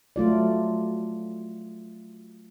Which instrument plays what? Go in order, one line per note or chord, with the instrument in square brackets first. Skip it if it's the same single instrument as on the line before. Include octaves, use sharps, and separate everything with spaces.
[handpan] F#3 A3 F4 D5